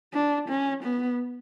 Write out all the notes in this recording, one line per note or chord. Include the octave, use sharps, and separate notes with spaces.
D4
C#4
B3